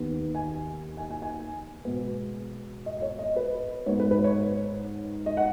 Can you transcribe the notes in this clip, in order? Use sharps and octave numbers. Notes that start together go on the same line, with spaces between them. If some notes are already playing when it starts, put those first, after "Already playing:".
Already playing: D#2 D#3 B3
G#5
G#5
G#5
G#5
B2 G#3 B3
D#5
D#5
C#5
D#5
B4
G#2 G#3 B3 C#5
B4
B4
C#5
D#5
F#5